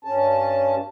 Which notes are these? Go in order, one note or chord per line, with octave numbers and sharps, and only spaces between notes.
G2 C#4 A5